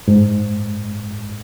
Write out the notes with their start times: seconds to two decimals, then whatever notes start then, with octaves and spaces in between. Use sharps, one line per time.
0.08 G#2